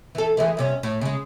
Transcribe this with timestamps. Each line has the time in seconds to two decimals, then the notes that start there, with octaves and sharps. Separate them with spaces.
0.15 E3 A4
0.37 E3 G#3 A3
0.57 G2 C3 C#4
0.83 A2
1.01 C#3 G#3